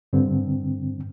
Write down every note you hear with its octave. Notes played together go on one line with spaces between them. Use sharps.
G2 D3 C4